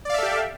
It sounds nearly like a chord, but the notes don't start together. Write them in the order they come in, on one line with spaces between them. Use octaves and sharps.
D5 F5 E5 A4 G4